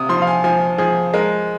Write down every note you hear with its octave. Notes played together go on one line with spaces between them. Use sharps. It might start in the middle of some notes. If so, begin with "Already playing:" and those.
Already playing: C3 D#6
F3 C6
F5
G#5
F3 G#5
F3 G#4
G#3 A#4